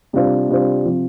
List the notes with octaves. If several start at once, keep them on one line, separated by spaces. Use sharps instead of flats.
C3 G3 D4 F4 C5
C3 G3 D4 F4 C5
C3 F3